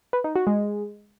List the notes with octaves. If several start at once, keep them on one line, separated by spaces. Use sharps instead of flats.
B4
D#4
F#4
G#3